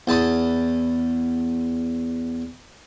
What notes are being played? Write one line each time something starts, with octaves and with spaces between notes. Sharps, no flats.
E2 A5 B5 D#6